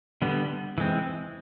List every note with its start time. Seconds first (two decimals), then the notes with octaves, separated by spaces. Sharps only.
0.22 D3 G3 B3
0.78 E3 G#3 C4